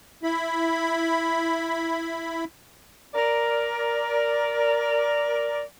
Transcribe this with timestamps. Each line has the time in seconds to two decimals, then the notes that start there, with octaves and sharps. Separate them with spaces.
0.23 E4 B5
3.14 A#4 D5